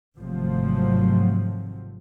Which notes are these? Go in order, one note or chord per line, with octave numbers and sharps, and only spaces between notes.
G#1 C3 F3 F#3 A3